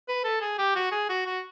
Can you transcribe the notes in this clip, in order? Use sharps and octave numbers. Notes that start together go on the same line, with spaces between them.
B4
A4
G#4
G4
F#4
G#4
F#4
F#4